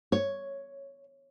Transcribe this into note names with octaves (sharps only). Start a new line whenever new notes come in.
C#5